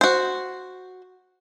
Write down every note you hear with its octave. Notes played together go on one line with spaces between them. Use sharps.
F#4 C5